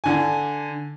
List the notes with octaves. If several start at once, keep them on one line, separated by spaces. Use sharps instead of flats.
D3 G#5